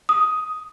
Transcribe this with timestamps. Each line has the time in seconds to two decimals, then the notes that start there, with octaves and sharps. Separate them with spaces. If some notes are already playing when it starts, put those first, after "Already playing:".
0.09 D#6